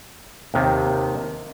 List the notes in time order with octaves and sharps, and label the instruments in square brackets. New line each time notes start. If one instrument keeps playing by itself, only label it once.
[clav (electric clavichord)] D#2 C3 D#3